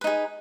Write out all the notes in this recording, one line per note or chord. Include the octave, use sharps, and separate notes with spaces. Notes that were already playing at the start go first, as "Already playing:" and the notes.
D#4 G#4 B4